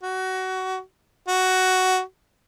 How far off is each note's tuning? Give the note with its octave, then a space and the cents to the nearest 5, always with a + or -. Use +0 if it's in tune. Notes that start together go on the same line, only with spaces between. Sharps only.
F#4 +20
F#4 +10